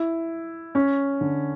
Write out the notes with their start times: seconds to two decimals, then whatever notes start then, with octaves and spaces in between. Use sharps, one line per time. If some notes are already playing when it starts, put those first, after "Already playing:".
Already playing: E4
0.75 C#4
1.21 D3